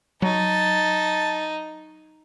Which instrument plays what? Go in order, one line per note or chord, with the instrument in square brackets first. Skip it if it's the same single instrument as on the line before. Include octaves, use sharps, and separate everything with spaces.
[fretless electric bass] F#3 [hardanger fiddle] D#4 [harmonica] A5